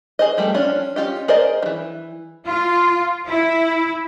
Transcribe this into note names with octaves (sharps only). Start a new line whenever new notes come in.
G#4 C5 D#5
F3 G3 A3
F3 C#4 D4
C#4 F4 G4 D#5
G#4 A#4 C5 D5 D#5
D#3 E3
F4
E4